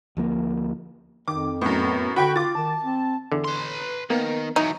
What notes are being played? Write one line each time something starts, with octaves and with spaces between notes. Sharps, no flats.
D2 F3 A#3
F2 D#3 D6
F#2 A2 B3
D3 F#4 G5 B5 C#6
F4 D6 A6
D#3 A5
C4
E2 D3
B4 C6
D#3 A#3 B3 A#4
E3 F#3 D#4